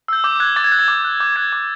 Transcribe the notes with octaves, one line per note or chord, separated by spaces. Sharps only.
E6 G6
D6 G6
F#6 G#6
D6 A6
G#6
F#6 G6
G#6
D6
F#6
D6 G6
F#6 G#6
D6